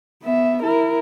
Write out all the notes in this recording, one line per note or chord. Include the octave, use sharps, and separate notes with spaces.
B3 E5
E4 A#4